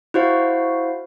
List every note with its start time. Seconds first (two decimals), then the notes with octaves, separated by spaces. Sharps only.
0.14 E4 F#4 C5 F5